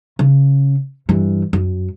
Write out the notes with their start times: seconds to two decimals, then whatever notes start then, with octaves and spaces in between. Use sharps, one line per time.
0.19 C#3
1.09 G2 E3
1.53 F#2